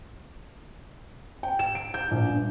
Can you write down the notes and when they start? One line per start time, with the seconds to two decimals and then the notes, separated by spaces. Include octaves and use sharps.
1.43 G5
1.59 E7
1.75 D7
1.94 G6
2.11 A#1
2.30 G2